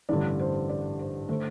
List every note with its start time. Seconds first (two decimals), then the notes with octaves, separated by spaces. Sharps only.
0.09 A1 G2 D3 D5
0.39 C5
0.69 D5
0.99 C5
1.29 D3 A3 C5